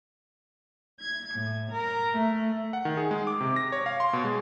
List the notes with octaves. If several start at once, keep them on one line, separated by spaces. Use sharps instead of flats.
G#6
A2
A#4
A3
F#5
D#3
G#4
G#3
D6
C3
A#6
C#5
F5
C6
B2
G#3